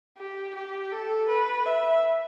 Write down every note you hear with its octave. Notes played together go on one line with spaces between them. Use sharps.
G4
G4
A4
B4
E5